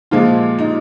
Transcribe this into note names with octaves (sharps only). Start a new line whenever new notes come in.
A#2 F3 G#3 F4
D#4